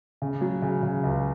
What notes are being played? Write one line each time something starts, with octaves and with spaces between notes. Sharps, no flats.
C#3
F#3
C#3
C#3
C#2